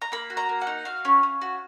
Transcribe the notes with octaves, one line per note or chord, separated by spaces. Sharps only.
A#5
A#3 B5
F#4
A#5
A#3
F#5
D#4
F#4 F5
C#4
C#4
F#4